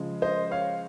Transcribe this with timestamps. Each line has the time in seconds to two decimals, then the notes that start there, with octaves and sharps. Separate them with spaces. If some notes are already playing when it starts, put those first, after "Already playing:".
Already playing: C#3 F3 G#3
0.22 C5 D#5
0.51 C#5 F5